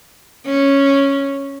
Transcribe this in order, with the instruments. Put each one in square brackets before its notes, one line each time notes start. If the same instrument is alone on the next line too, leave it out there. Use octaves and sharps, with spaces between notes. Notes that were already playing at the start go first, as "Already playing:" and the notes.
[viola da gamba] C#4